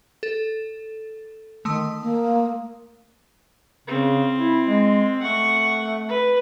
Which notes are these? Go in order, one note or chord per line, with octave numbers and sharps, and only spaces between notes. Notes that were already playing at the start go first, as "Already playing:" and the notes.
A4
D#3 A3 C6 D#6
A#3
C#3 C4
E4
G#3
A3 F#5 C#6
B4